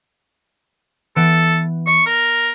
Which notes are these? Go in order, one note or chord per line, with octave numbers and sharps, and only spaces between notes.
E3 B3 A4 D7
D#5 C#6
A#4